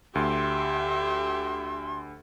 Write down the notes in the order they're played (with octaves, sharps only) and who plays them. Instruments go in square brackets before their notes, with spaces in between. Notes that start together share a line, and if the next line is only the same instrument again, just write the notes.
[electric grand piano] D2 [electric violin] G4 E5 [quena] C6